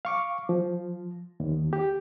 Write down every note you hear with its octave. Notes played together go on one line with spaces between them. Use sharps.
F5 C#6 D6
F3
D#2
G4